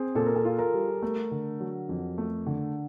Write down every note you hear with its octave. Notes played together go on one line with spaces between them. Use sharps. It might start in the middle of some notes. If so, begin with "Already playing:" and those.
Already playing: C4 G#4
A#2 A4
A#4
A4
F4
A#4
G3
A3 A#4
D3
F#3
F2
A3
D3